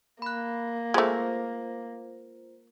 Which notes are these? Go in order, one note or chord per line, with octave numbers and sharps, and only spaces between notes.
A#3 B5 F#6
G#3 A3 F4 C5